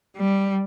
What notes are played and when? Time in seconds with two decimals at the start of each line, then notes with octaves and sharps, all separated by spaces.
0.17 G3